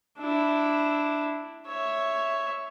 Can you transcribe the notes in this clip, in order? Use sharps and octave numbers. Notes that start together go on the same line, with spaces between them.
D4 E4
C#5 E5